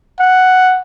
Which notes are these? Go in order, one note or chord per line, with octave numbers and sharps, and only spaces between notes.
F#5